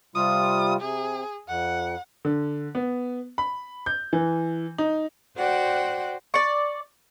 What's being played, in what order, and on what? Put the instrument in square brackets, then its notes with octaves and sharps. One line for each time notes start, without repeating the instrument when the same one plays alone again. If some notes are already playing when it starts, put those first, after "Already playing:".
[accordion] C3 G3 F4 [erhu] D#6
[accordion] C3 [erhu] G#4
[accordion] F2 [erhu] F#5
[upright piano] D3
B3
B5
G6
E3
D#4
[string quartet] F#4 C5 D5 F#5 G5
[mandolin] D5 C#6